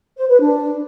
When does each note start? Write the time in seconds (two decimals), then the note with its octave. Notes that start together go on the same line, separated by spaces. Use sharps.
0.18 C5
0.29 B4
0.40 D4